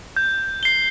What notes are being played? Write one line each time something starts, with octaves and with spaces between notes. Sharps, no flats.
G6
C7 G7